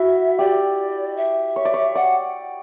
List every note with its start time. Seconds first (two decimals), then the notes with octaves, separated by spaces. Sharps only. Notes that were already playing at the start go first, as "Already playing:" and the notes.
Already playing: E4 F#4 E5
0.39 G4 D5
1.17 E5
1.56 C#5
1.65 D5
1.74 C#5
1.95 D5 F#5